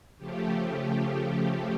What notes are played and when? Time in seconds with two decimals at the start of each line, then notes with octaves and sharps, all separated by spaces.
0.18 C#3 F3 A3 G4